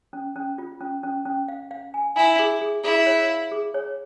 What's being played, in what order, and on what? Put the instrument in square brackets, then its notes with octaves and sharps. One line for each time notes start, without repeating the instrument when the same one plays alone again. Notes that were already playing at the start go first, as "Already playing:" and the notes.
[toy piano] C#4
C#4
F4
C#4
C#4
C#4
F5
F5
G#5
[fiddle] E4 [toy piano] G#5
[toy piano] G#4
G#4
[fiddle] E4 [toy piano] G#4
[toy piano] C#5
F5
G#4
C#5